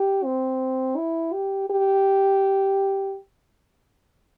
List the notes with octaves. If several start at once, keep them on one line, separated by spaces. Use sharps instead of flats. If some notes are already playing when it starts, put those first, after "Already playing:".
Already playing: G4
C4
E4
G4
G4